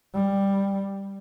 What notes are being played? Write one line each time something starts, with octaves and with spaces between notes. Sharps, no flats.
G3